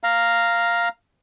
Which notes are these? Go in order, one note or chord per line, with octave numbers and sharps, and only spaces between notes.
F5 A#5